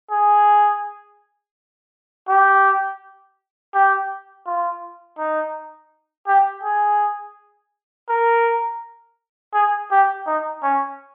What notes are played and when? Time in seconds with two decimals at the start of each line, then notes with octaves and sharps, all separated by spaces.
0.11 G#4
2.29 G4
3.74 G4
4.46 F4
5.19 D#4
6.28 G4
6.64 G#4
8.09 A#4
9.54 G#4
9.91 G4
10.27 D#4
10.63 C#4